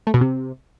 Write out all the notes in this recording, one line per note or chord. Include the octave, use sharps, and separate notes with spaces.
A3
B2
C3